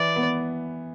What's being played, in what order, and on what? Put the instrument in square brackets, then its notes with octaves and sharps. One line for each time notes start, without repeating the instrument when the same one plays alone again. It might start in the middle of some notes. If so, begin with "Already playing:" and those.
Already playing: [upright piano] E3 [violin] D5
[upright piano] B3